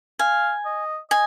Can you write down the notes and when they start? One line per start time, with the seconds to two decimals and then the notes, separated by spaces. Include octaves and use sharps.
0.19 F5 G#5
0.65 D#5
1.11 D#5 G#5